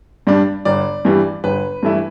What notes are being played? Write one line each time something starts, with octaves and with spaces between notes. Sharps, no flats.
G2 G3 D4
G1 D5
G2 E3 G3
G1 B4
G2 E3 A3 E4